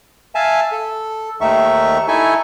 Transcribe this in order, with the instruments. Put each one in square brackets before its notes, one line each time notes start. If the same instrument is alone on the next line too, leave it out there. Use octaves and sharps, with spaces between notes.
[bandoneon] E5 F5 G#5 A5
A4
D#2 D#3 A3 D#4 E5 C#6
D#4 E4 A4 E5 G#5 C#6